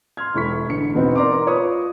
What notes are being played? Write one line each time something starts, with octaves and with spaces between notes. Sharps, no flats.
C6 F6 G#6
E1 E4 A4 C#6 B6
A1 D3 C#7
E2 B2 B3 C4 D#4
A#4 D5 A#5 C6 D6
F4 B4 C#5 C#6 D#6